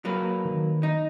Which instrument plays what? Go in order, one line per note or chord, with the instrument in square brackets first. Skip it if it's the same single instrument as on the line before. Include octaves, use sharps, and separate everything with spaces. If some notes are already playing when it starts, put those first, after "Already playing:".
[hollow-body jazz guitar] F#3 A#3 B4
[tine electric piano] D#3
[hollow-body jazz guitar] D#4